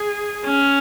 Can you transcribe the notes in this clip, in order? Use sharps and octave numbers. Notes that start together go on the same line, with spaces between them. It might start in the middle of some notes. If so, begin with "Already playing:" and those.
Already playing: G#4
C#4